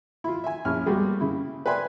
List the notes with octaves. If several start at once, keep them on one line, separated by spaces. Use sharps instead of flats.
E4 F4
E5 G#5
A#1 C#4 E4 G#5 F6
G3 G#3 A#3 B3 F#4 G#4
C#3 E4
B4 D5 E5 G5 G#5 C6